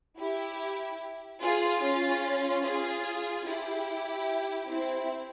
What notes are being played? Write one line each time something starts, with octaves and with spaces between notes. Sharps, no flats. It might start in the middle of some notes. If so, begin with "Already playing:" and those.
E4 G4
F4 G#4
C#4 F4
F4 G#4
E4 G4
C4 E4